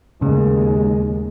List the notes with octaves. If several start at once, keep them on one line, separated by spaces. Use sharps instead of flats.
D#2 A2 C#3 G#3